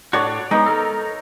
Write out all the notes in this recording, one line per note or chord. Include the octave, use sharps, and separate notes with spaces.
A2 D4 F#4 C#5 D5
G#3 B3 D#4
A4 A#4